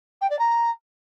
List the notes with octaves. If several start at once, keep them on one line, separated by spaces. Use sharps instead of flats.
G5
D5
A#5